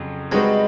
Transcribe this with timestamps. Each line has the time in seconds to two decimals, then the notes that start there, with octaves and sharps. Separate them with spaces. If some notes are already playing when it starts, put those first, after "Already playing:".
Already playing: F2 C#3 F#3
0.31 G3 G#3 C4 D#4 F#4 B4